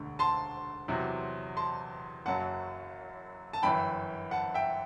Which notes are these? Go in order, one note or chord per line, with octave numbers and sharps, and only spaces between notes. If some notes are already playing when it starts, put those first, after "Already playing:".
Already playing: E1 D2 D3
A5 C6
E2 C3 F#3
A5 C6
F#1 F#2 F#3 F#5 A5
A5
G1 F#2 E3 G5 B5
F#5 A5
E5 G5